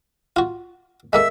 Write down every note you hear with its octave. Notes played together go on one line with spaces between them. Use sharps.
F4 F#4
G#3 A#3 A4 E5